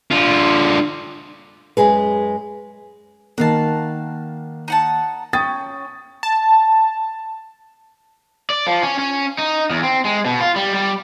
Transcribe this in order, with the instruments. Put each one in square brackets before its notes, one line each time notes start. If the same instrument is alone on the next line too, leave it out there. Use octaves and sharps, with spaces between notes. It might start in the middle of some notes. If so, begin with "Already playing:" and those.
[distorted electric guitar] D3 F4
[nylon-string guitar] F#2 G#3 G#4 B4
[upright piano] D#3 A#3 [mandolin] F#4 F5 A5
[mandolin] D#4 F#5 A5
[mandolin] C#4 [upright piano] G5 D#6 A6
[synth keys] A5
[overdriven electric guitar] D5
F3
C#4
C#4
D#4
E2
C4
G#3
B2
F4
G3
G3